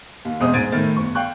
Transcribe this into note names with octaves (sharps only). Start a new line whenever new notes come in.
D#2
E1 E2 G#3 C4 D#6
G#2 C5 G#6 A6 D7 D#7
A2 D#3 A3 A6
G1 C#6
F5 G5 C#6 F#6